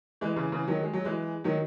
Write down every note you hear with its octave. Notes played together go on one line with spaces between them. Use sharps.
E3 G#3
C#3 E3
C#3 E3
D#3 F#3
G#3
F#3
E3 G#3
D#3 F#3